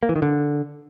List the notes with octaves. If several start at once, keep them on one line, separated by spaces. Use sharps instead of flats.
A#3
E3
D#3
D3